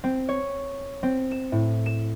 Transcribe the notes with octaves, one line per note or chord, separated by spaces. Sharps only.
C4
C#5
C4
E7
A2
E7